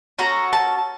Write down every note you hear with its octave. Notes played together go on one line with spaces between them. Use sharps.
C#4 F#4 A4 A#5
A5